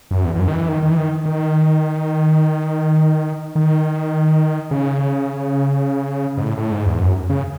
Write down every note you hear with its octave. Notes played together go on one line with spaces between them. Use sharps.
F#2
E2
E2
F#2
D#3
E3
D#3
D#3
E3
D#3
D#3
D#3
C#3
G#2
A2
A2
G#2
E2
F#2
C#3